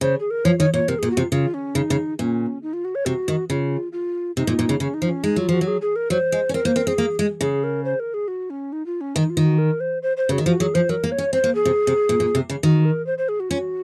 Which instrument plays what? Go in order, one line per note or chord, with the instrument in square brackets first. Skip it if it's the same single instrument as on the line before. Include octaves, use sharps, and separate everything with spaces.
[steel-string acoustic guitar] C#3 [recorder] C5
[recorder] G#4
A#4
[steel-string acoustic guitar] F3 [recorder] C#5
[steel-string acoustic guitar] D#3 [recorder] C#5
[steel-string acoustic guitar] A#2 [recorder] C#5
[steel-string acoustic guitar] C3 [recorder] A#4
[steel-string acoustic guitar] A#2 [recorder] G#4
[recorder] F#4
[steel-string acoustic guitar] C3
[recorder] F4
[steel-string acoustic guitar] C#3 [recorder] F4
[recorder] C#4
[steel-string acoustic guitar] C#3 [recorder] D#4
[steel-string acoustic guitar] C#3
[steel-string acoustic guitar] A#2 [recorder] C#4
[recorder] D#4
F4
F#4
C#5
[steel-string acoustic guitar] C3 [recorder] F#4
[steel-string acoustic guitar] D#3
[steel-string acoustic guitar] C#3 [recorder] F4
[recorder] F4
[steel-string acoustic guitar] C3 [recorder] D#4
[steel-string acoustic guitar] A#2
A#2
C#3
[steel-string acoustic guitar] C#3 [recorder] C#4
[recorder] D#4
[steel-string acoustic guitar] F3
[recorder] C#4
[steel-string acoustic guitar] G#3 [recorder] D#4
[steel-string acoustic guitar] F#3 [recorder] F4
[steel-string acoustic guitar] F3 [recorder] F#4
[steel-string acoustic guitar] F#3
[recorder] G#4
G#4
A#4
[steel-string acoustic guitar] F#3 [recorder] C5
[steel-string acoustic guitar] G#3
C#4
[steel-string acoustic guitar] C4 [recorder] A#4
[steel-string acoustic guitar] A#3 [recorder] C5
[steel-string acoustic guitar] C4 [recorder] A#4
[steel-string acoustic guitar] C4 [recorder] G#4
[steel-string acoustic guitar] A#3
G#3
[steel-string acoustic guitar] C#3 [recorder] G#4
[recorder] A#4
C5
A#4
G#4
F#4
C#4
D#4
F4
C#4
[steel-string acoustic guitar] D#3 [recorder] D#4
[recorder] F4
[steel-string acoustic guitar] D#3
[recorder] F#4
A#4
C5
C5
C5
[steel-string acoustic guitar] C#3 [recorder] F#4
[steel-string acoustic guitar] D#3
[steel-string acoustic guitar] F3 [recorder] F#4
[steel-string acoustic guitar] F#3 [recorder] G#4
[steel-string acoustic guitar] F3 [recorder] C5
[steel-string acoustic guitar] F#3 [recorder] A#4
[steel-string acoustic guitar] A#3
[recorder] C#5
[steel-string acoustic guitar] C#4
[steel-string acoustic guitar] C4 [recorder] C5
[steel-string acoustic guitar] A#3
[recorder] G#4
[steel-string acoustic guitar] C3
C3
A#2
A#2
C3
C#3
[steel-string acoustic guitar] D#3 [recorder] F#4
[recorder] A#4
C5
C5
G#4
F#4
[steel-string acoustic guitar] C#4 [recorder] F4
[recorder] F#4